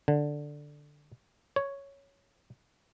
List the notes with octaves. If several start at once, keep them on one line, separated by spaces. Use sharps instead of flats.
D3
C#5